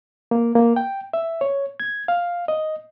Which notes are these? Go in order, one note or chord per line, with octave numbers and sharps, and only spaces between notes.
A#3
A#3
G5
E5
C#5
G#6
F5
D#5